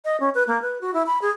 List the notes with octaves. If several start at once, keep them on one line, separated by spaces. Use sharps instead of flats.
D#5
C#4
B4
A#3
B4
F#4
E4
B5
G#4